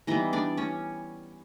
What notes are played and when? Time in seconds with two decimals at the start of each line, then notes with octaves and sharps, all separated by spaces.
0.07 E3 G3 B3 D#4 D#5
0.33 D4 D5
0.57 C#4 C#5